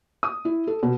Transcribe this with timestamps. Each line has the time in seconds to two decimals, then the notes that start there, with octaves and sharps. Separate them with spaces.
0.23 D#6
0.45 E4
0.67 A4
0.83 B2